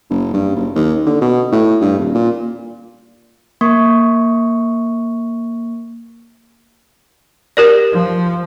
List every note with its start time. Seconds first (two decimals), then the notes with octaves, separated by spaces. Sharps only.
0.10 F#1
0.34 G2
0.56 F#1
0.75 D#2
1.06 D3
1.21 B2
1.52 A2
1.81 G2
1.99 D#1
2.15 A#2
3.61 A#3 C#6
7.57 G4 A#4 D5
7.92 F3